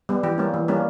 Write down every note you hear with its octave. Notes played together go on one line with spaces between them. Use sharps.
G3 B3
E3 G4
G3 A#3 C#4
E3
G3 A#3 C#4